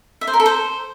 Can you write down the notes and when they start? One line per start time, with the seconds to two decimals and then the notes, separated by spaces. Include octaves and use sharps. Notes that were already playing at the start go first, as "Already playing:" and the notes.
0.21 E5
0.27 C5
0.34 A#4
0.40 A4
0.46 C5